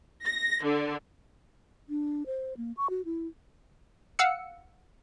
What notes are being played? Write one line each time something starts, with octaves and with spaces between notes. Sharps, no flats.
A#6
D3
D4
C5
A#3
C#6
F#4
E4
F5 F#5 E6 C#7